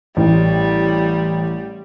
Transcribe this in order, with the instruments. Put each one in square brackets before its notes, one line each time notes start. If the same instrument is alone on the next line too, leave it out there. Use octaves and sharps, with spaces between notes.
[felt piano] A1 [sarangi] G3